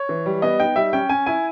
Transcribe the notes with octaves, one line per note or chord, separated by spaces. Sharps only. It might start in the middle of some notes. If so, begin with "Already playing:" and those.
Already playing: C#5
E3
G3
B3 D#5
D#4 G5
G3 E5
C#4 G5
C#4 G#5
E4 G#5